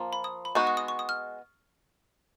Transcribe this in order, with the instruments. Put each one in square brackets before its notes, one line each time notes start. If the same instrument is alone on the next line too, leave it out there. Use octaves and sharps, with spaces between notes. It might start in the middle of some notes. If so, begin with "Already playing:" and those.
Already playing: [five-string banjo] F3 A#3 F4
[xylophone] B5
D#6
B5
[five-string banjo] G#3 B3 D#4 F#4 [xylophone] C#6
[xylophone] C#6
D#6
C#6
D#6
F6